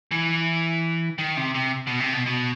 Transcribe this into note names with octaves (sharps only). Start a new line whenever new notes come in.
E3
D#3
C3
C3
B2
C3
B2
B2